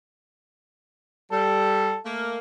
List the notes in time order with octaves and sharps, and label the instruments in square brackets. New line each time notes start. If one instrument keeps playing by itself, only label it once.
[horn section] G3 [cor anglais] A4
[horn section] A3 A#3